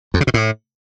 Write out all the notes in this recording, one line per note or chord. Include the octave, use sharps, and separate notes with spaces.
F2
C#3
B2
A2